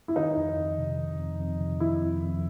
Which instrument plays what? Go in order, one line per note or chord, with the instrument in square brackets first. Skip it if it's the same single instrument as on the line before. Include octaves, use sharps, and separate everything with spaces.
[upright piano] E4
[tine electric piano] D#3 [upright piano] D#4
[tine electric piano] F2
F2
C3
D#3
F2
F2
C3
[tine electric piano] D#3 [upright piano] E4
[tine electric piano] F2
F2